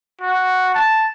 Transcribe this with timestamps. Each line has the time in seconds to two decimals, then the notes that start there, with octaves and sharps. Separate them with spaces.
0.21 F#4
0.75 A5